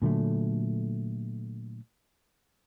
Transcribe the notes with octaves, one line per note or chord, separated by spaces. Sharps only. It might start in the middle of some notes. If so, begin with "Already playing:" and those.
A#2 D3 F#3 A3